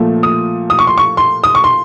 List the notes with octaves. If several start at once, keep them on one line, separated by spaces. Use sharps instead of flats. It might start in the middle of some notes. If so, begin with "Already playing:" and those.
Already playing: A#2 F3 A3
D#6
D#6
C#6
C6
C#6
C6
D#6
C#6
C6